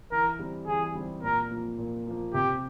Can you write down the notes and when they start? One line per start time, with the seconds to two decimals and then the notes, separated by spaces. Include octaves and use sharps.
0.12 E3 A#4
0.39 G3 C4 G4
0.67 E3 G#4
0.95 G3 C4 G4
1.23 A#2 A#4
1.51 F3 A#3
1.78 A#2
2.06 F3 A#3
2.34 C3 G4